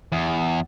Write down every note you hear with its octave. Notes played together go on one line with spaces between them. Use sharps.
E2